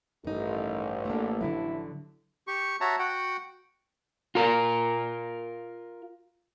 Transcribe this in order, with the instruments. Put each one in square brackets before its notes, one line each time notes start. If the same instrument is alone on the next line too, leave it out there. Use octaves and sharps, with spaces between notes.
[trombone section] A1 [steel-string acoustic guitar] G2 D#4 [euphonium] D#3
[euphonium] D3 [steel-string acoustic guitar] A3 A#3
[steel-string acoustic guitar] D3 F3 F#3 [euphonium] E4
[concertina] G4 C#6
F#4 C#5 E5 A5 A#5
F#4 F#5 G5
[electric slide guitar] F4 A#4